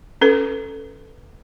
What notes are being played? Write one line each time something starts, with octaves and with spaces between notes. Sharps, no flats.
C#4 A4 B4